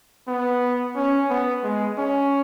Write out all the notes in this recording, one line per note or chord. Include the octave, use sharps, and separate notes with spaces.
B3
C#4
B3
G#3
C#4